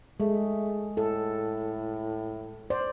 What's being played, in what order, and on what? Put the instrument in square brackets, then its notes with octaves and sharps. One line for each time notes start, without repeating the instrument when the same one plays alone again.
[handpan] G#3 [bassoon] A3
[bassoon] A2 [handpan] A4
[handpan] C5 D5